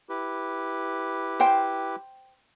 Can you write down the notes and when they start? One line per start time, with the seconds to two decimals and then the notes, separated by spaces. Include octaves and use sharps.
0.09 E4 G4 B4
1.40 C5 G5